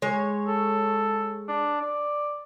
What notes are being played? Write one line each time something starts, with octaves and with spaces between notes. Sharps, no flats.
G#3 C#5
A4
D4
D5